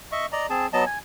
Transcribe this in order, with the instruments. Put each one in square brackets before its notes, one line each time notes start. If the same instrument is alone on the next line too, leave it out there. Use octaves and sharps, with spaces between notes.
[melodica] D#5 E5 C#6
D5 D#5 A#5
C4 G#4 A5
F#3 B3 D#5 A5
G#5